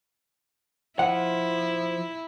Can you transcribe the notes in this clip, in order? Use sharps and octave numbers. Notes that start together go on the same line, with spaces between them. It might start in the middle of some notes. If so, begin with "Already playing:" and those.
F3 E4 F#5